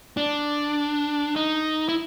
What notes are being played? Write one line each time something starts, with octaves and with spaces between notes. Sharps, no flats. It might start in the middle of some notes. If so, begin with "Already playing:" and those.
D4
D#4
E4